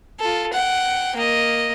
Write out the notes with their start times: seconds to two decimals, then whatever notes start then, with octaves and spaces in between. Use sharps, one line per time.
0.20 F4 A4
0.53 F#5 G5
1.16 A#3 D#5